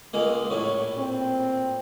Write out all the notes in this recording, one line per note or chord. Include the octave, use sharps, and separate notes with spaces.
C#2 G#3 A#3
A#1 A2 C#5
C4